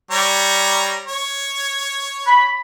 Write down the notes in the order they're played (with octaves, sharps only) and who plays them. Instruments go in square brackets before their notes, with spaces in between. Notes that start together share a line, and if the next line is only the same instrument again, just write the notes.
[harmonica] G3 C#5 A#5
C#5
[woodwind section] B5